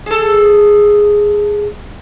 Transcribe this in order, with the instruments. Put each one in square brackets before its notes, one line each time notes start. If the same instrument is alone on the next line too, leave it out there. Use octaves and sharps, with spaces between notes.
[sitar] G#4 A4